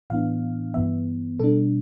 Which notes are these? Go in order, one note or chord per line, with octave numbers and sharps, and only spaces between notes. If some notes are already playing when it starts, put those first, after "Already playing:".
A2 E3 B3 D4 F5
G2 E3 B3 E5
B2 G3 D4 A4